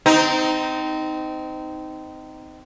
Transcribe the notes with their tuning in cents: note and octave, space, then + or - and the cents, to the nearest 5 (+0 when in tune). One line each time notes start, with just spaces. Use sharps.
C4 -25 D#4 +0